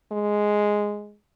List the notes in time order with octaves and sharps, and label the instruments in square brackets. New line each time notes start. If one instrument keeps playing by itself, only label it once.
[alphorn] G#3